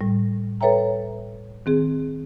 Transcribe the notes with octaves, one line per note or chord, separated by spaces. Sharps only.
A2 G3
A4 B4 C#5 E5 G5 A#5
D#3 C4 G#4